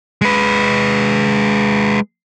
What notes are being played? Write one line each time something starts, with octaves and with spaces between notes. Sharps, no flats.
G#3 B4